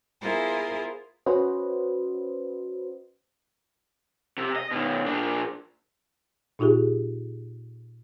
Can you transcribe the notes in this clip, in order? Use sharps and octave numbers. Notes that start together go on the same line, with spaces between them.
B3 E4 F4 G#4 A#4 C5
C#4 F#4 B4 C5 D#5
C3
D#5
B2 D#3
A#2 D4
A#2 D#4 F4 G4 G#4